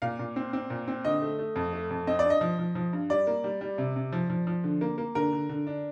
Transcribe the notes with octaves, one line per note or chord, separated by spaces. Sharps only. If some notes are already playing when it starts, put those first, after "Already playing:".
A#2 F5
A#2
C4
C4
A#2
C4
D3 D#5
A3
A3
F2
A3
F2
C4 D#5
D5
G2
D#5
F3
F3
F3
G2
G3 D5
A#3
G3
G3
C3
C3
F3
F3
F3
D3
A#3
A#3
D3 A#4
D3
D3
D4